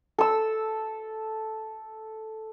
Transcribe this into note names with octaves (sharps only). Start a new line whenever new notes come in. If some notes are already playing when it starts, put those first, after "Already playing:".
A4 E6